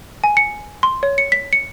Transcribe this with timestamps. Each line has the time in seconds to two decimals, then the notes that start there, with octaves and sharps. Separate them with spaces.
0.24 G#5
0.37 C#7
0.83 C6
1.03 C#5
1.18 C#7
1.32 B6
1.53 C#7